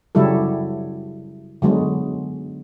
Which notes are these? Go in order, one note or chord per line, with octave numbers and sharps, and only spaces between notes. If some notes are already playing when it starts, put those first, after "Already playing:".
C#3 F#3 G3 E4 A4
D3 F#3 G#3 B3